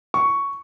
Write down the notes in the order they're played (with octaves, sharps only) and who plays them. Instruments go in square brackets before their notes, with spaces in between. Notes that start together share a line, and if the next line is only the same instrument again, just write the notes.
[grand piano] C#6